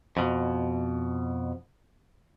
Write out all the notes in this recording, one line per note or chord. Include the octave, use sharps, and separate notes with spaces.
F2 B2